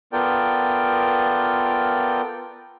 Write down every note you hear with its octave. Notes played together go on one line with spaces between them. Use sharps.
B3 F4 A4 A#4 D5 G5